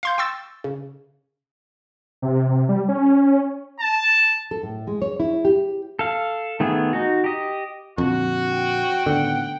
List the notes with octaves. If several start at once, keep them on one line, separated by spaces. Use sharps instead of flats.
F5 C6 G6
G5 C6 C#6 E6 A6
C#3
C3
C3
G3
C#4
A5
A4
A2
G#3
C#5
E4
G4
A4 F5
D#3 A3 B3 G#4
D#4 F#4
G4 D#5
F2 A#2 D3 F3 F#4
G5
A2 D3 D#3 B3 F#5